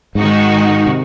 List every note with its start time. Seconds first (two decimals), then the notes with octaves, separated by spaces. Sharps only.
0.15 G#2 D#3 G#3 D#4 F#4
0.86 C3